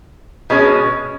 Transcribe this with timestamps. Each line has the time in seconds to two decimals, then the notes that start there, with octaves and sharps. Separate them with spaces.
0.50 B2 G#3 C#4